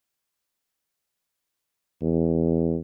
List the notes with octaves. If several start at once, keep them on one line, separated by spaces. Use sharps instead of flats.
E2